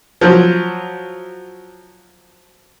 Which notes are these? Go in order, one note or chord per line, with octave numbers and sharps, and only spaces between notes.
F3 F#3